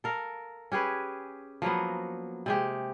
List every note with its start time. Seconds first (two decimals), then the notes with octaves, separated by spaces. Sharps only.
0.04 A4 A#4 F5
0.72 C#4 G4 G#4 B4
1.62 F3 F#3 A#3 B3
2.46 C3 G#3 G4